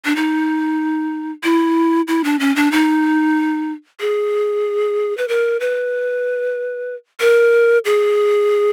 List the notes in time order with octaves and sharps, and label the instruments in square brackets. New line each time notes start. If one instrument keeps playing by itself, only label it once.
[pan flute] D4
D#4
E4
E4
D4
C#4
D4
D#4
G#4
B4
A#4
B4
A#4
G#4